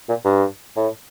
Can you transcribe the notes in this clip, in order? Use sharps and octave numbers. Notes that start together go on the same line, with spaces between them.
A#2
G2
A2